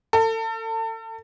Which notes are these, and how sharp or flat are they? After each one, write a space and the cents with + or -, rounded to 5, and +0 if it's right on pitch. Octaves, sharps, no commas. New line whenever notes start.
A4 +35